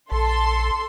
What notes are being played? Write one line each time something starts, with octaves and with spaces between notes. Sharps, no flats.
A#1 A4 C6